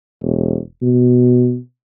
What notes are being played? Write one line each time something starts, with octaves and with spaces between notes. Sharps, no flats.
E1
B2